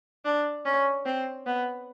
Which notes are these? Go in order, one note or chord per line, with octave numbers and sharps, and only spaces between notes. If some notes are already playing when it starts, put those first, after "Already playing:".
D4
C#4
C4
B3